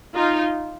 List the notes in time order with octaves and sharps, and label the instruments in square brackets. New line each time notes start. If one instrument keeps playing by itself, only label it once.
[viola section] D#4 F4